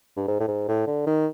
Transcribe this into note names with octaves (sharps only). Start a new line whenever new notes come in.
G2
G#2
A2
G#2
A2
D3
D#3